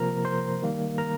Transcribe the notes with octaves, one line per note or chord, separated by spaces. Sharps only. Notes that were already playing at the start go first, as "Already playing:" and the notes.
Already playing: C3 F3 A#3 A#4 A#5
C5 C6
D#3 G3 A#3
A#4 A#5